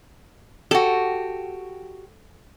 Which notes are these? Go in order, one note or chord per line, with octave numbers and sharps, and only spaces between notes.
F#4 G4 A4